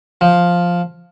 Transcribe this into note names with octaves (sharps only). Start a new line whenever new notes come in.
F3